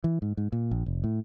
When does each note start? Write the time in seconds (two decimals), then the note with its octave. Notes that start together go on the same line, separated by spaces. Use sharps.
0.04 E3
0.22 G#2
0.37 G#2
0.52 A#2
0.71 A#1
0.86 F1
1.04 A2